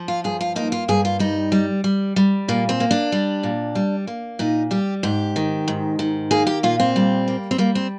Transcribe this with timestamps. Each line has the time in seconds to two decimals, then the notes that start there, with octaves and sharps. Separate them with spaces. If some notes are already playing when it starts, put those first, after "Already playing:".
Already playing: F3
0.08 F4
0.24 G2 G#4
0.41 F4
0.56 A#3 D#4
0.72 F4
0.88 G2 G#4
1.05 F4
1.19 G3 D#4
1.52 G3
1.84 G3
2.16 G3
2.48 A#2 A#3
2.69 C4
2.80 A#3
2.91 D4
3.12 G3
3.43 A#2
3.75 G3
4.07 A#3
4.39 A#2 D#4
4.71 G3 G4
5.03 G#2 G4
5.36 D#3
5.68 G#2
5.99 D#3
6.31 A#3 G#4
6.47 G4
6.63 A#2 F4
6.80 C4
6.96 G3
7.28 A#3
7.51 C4
7.58 G3 A#3
7.75 C4